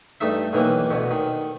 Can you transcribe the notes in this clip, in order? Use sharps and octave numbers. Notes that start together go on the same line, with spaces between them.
G2 A3 D#4 E5
B1 D#3 E3 A#3
D2 B2
D#3